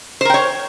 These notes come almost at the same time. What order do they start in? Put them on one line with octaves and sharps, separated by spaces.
C5 A#4 G5 C#5